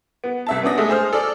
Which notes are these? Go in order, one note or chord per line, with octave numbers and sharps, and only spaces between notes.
B3
C2 E5 A5
B3 C#4 D4 D#6 A#6
G#3 A3 A4
G#4 C5 F6
A4 D5